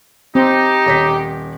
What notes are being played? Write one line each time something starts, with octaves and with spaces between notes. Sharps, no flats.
C4 D#4 G4
D#1 C#5 B6